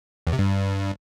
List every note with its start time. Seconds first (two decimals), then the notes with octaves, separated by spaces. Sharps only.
0.27 E2
0.33 C3
0.39 G2